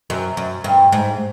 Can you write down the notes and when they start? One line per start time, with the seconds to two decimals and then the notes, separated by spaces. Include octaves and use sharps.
0.10 F#2
0.37 F#2
0.64 G2
0.92 G#2